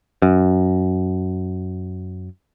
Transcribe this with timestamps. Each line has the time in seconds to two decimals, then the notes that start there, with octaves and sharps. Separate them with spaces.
0.22 F#2